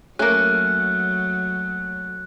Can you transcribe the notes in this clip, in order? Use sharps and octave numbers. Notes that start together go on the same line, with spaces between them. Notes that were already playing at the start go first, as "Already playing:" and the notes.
F#3 A3 A#3 C#4 F#6